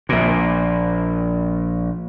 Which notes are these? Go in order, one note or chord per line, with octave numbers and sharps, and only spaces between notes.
A#1 A#2